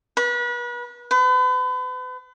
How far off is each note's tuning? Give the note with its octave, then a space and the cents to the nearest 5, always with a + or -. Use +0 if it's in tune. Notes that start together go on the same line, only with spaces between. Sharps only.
B4 -35
B4 +40